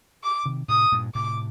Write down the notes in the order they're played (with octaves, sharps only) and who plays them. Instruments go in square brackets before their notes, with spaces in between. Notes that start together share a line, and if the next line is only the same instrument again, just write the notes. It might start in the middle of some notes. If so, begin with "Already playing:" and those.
[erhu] D6
[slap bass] C3 D#3
[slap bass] A2 C3 [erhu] D#6
[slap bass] G2 A#2
[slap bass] A2 C3 [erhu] D6